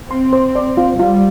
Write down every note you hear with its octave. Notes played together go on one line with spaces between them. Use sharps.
C4 C6
C5
D5
F4
G3 F4